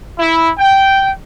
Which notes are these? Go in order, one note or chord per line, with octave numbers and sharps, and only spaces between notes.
E4
G5